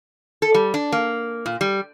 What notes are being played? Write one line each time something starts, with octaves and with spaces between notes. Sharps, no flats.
A4
G3
D4
A#3
A#2
G3